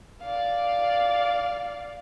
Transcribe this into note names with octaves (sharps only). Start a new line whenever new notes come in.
D5 F5